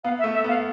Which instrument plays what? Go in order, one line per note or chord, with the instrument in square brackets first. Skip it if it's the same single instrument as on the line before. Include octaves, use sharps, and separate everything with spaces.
[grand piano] B3 [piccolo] F5
[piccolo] E5
[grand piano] A3
[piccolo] E5
[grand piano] B3
[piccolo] F5